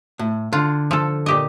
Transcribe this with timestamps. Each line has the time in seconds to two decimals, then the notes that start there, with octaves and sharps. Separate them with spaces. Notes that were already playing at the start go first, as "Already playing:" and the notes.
0.19 A2
0.53 D3 F4
0.91 F3 A4
1.26 A#2 G4 D#5